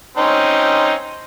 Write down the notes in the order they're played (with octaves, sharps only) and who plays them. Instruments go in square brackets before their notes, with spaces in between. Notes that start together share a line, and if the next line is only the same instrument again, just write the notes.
[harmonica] C4 C#4 D#4